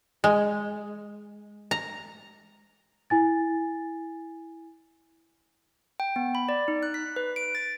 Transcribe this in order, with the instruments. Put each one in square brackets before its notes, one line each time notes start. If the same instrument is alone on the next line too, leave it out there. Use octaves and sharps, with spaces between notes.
[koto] G#3
A#5
[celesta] E4 G#5 A6
[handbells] G5
B3
B5
D5
D#4
F#6
B6
B4
D7
A6